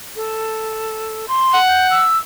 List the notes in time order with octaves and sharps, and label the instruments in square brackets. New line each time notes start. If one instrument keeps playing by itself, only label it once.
[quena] A4
C6
[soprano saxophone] F#5
[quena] G6
E6